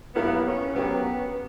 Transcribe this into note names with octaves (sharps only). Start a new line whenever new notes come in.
G2 F#3 A#3 B3 E4 A#4
C#4
F#3 B3 C#4 G4 A#4